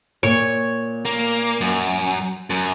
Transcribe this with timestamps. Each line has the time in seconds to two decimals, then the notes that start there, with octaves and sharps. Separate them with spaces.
0.23 A#2 C#5
1.05 A#3
1.61 F#2
2.50 F#2